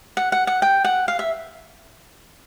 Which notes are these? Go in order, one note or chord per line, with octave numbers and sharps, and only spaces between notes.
F#5
F#5
F#5
G5
F#5
F5
E5